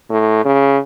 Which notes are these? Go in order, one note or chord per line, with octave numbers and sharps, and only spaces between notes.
A2
C#3